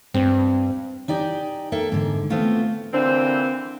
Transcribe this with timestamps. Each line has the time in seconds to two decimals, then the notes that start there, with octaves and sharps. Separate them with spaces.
0.14 G2 C4
1.08 D#4 G4 D5 G#5
1.72 A#3 A4 E5 G5
1.92 G#2 D3
2.30 A3 B3 C4 F4 F#4
2.93 A#2 D3 E3 C4